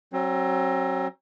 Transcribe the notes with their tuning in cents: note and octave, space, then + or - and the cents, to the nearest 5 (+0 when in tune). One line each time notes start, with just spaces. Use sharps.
F#3 +25 C4 +40